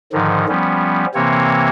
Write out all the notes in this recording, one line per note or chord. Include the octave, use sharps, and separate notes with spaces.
G#2 D3 D#3 F3
F3 G3 B3 C#4
C3 E3 A#3 C4 C#5